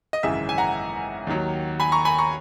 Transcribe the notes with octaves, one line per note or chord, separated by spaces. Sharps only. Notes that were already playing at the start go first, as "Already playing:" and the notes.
D#5
G#1 F#2 C#3 E3 G#3 E5
G#5
F#5 A#5
D#2 D#3 F#3
G#5 B5
A#5 C#6
G#5 B5
A#5 C#6